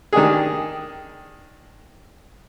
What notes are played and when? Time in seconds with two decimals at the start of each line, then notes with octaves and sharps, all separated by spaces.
0.12 D#3 D4 G4 G#4